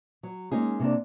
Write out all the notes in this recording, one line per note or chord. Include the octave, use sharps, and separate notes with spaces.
F#3
G#3 A#3 C#4 D#4 G#4
C3 A#3 D4